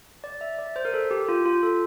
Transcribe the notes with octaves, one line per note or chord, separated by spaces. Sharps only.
D5
E5
D5
C5
A#4
A4
G4
F4
F4
A4